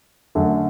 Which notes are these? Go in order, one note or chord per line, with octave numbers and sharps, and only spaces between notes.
F#2 D3 A3